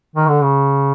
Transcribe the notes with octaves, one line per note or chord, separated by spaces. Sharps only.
D#3
D3
C#3